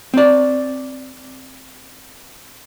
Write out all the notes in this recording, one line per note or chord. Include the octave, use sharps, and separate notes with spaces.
C4 D5